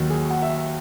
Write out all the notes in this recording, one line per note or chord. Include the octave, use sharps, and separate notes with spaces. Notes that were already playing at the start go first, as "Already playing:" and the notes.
Already playing: D#2 D#3 F#3
G#4
F#5
E5